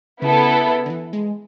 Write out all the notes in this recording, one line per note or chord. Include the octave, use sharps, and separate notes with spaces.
C#3 B3 E4 A4
D3
E3
G#3